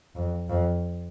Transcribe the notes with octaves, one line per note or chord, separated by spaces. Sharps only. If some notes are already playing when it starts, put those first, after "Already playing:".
F2
F2